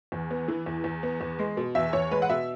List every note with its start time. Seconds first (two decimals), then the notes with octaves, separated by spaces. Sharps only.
0.12 E2
0.31 B3
0.48 E3
0.66 E2
0.84 E2
1.03 B3
1.21 E2
1.39 G#3
1.57 B2
1.75 E2 E5
1.93 E2 C#5
2.11 G#3 B4
2.22 F#5
2.29 B2 E5